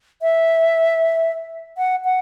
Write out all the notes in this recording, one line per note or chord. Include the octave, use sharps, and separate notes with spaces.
E5
F#5
F#5